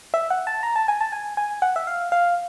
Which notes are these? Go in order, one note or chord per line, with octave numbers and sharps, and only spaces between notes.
E5
F#5
A5
A#5
A5
G#5
A5
G#5
G#5
F#5
E5
F5
F5